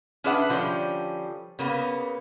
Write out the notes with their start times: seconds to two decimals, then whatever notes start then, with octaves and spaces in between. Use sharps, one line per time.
0.24 C#4 D4 G#4 B4 E5 F#5
0.49 D3 F3 G3 C#4
1.59 C#3 A#3 B3